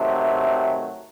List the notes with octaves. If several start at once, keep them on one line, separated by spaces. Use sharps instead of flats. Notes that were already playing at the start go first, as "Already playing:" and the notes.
Already playing: C3 D#3 F#3 A3